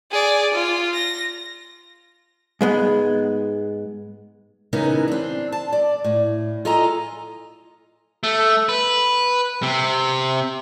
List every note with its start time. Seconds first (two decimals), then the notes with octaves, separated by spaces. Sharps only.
0.12 G#4 D5
0.54 F4
0.94 A#6
2.61 G#2 G#3 B3
4.73 C#3 E3 B3 C#4 D#4 A#4
5.08 C4 D4
5.52 A5
5.72 D5
6.04 A2
6.65 F4 A4 D#5 G#5 A#5
8.23 A3
8.69 B4
9.63 C3